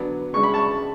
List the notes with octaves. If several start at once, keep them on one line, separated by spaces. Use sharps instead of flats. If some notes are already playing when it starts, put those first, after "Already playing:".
Already playing: D3 F#3 B3 D4
C#3 G#3 D4 C#6
B5
A5 C#6